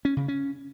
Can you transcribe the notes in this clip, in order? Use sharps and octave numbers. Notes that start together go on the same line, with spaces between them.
C#4
C#3
C#4